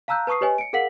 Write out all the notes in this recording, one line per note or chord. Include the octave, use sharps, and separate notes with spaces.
F5 A5 A#5 E6 F#6 G6
B4 A5 C#6 D#6 C7
G4 B4 C#5 D#5 G#5
C#7 D7
G#4 A#4 F5 F#5 B6 F#7